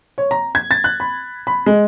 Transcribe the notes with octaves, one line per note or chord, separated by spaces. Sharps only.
C#5
A#5
G#6
A6
F#6
B5
B5
G#3